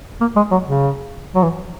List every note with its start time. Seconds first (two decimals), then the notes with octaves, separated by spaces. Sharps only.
0.21 A#3
0.36 G#3
0.51 F#3
0.66 C#3
1.35 F#3
1.43 E3